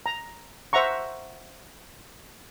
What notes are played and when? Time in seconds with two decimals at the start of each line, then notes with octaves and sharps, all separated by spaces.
0.06 A#5
0.73 C5 E5 F#5 A#5 C#6